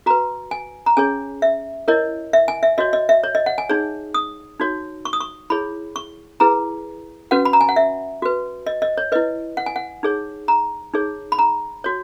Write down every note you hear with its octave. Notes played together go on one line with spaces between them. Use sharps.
F#4 B4 A#5
G#5
A#5
C#4 G#4 C#5 G#5
E5
E4 A#4 C#5 D#5
E5
G#5
E5
F#4 C#5 D#5
D#5
E5
C#5
D#5
F#5
G#5
D#4 G#4 C#5
D#6
D#4 F#4 C#5
C#6
D#6
C#6
E4 G#4 C#5 B5
C#6
E4 G#4 B4 A#5
C#4 F#4 B4 F#5
B5
A#5
G#5
F#5
E5
F#4 B4
D#5
D#5
C#5
E4 B4 D#5
F#5
G#5
F#5
D#4 G#4 C#5
A#5
D#4 G#4 C#5
B5
A#5
F#4 C#5